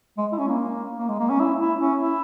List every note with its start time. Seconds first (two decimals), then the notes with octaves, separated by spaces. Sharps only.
0.18 G#3
0.32 E4
0.38 C#4
0.48 A#3
0.98 A#3
1.08 G#3
1.19 A#3
1.30 C#4
1.39 E4
1.59 E4
1.80 C#4
2.00 E4